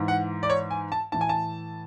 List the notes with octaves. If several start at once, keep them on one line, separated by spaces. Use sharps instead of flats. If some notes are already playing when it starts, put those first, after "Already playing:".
Already playing: G#2 E3
F#5
D5
C#5
G#5
A5
A2 E3 A5
G#5
A5